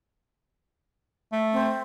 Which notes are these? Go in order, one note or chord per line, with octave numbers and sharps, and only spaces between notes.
A3
C4